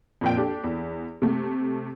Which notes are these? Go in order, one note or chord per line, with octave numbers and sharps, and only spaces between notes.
F2 A#2 G5
D4 G4 A4
E2
C3 A3